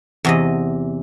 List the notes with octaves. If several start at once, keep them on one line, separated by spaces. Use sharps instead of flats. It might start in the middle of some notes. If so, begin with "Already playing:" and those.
E2 C3 D#5